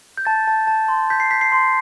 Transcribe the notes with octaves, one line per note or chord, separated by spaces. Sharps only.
G6
A5 A6
A5
A5
C6
G6 B6
C7
G6 B6
C7
C6